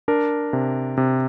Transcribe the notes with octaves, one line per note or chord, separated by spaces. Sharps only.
D4 A#4
C3
C3